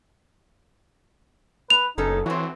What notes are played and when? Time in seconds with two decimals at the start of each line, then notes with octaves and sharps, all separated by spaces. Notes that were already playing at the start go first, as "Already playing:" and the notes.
1.70 B4 F7
1.98 F#1 B3 C#4 D#4 A4
2.26 E3 C4 F#4 C#5